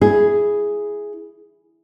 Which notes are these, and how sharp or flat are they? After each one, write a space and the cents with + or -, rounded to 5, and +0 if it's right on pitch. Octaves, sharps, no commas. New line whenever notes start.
E4 +0 G#4 +0